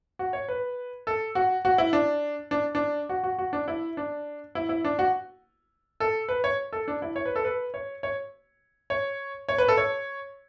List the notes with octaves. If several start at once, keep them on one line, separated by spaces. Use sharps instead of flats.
F#4
C#5
B4
A4
F#4
F#4
E4
D4
D4
D4
F#4
F#4
F#4
D4
E4
D4
E4
E4
D4
F#4
A4
B4
C#5
A4
D4
E4
C#5
B4
A4
B4
C#5
C#5
C#5
C#5
B4
A4
C#5